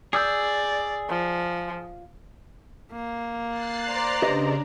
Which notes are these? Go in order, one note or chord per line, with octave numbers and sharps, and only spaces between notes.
G#4 D5 E6 G6
F3
A#3
F#6 A6 C7
C5 D5 A#5
C#3 D4 G4 B4 D#5